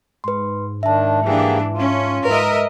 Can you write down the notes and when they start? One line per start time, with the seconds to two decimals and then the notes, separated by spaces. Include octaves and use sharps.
0.24 G#2 B4 C6
0.83 D#3 D4 E5 A5
1.24 E3 A#3 D4 G4 G#4
1.73 C#4 F4
2.25 G#2 A#4 B4 D#5 E5